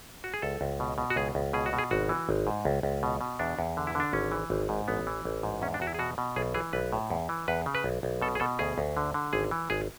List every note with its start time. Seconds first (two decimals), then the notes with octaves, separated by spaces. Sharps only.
0.24 F#4
0.34 G#4
0.42 C#2 A4
0.61 C#2
0.80 B2
0.98 B2
1.10 F#4
1.16 C#2 G#4
1.35 C#2
1.53 B2 G#4
1.66 F#4
1.73 B2
1.78 G#4
1.91 G#1 F#4
2.09 E3
2.29 G#1
2.47 G#2
2.65 C#2
2.83 C#2
3.03 B2
3.21 B2
3.39 E2 D4
3.59 E2
3.77 D3
3.87 E4
3.95 D3 D4
4.13 G#1 C#4
4.32 E3
4.50 G#1
4.69 G#2
4.88 A1 B3
5.07 E3
5.25 A1
5.43 G#2
5.62 E2 C#4
5.74 D4
5.80 E2 F#4
5.87 E4
5.94 G#4
5.99 B2 F#4
6.18 B2
6.36 B1 G#4
6.54 E3 G#4
6.73 B1 B4
6.93 A2
7.10 E2
7.29 E3
7.48 E2 B4
7.66 C#3
7.75 B4
7.84 B1
8.03 B1
8.22 B2 A4
8.35 G#4
8.40 B2 A4
8.59 D2 G#4
8.78 D2
8.97 D3
9.14 D3
9.33 G#1 G#4
9.51 E3
9.70 G#1 G#4